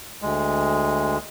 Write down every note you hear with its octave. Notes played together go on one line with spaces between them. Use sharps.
D2 G#3